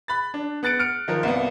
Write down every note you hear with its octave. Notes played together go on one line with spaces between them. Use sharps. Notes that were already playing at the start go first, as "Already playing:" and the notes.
B5 F#6 A6
D4
B3 F#6 A6 C#7 D7
F6 C#7 D7
D#3 F3 A#4
C2 A#3 B3